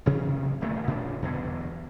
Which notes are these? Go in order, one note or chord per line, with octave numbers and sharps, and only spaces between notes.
A1 C3 F#3 A#3
D#1 G2 A#2 A3
A#2 C#3 D4
E2 G2 B2 D3